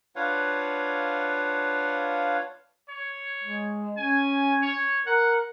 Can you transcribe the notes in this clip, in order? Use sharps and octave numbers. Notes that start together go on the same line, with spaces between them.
D4 F4 B4 C#5 F5 F#5
C#5
G#3
C#4 G#5
C#5
A#4 F#5